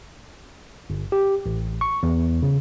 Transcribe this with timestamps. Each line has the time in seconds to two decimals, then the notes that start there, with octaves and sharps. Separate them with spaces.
0.90 G1
1.12 G4
1.46 A1
1.81 C#6
2.03 E2
2.42 C#3